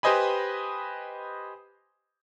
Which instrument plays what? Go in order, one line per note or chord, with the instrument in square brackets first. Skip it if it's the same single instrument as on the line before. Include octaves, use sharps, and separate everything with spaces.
[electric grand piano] G4 B4 C5 D#5 G#5 B5